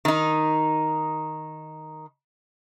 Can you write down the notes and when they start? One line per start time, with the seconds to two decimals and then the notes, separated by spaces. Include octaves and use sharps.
0.05 D#3 D#4